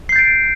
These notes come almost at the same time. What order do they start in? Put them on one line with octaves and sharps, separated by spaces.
C7 G6 A6 D7